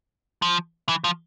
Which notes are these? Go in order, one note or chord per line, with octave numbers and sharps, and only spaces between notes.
F3
E3
F3